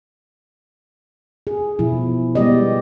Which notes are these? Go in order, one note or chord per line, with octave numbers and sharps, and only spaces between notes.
G#4
B2 F3 E4
G3 G#3 B3 G4 D5 D#5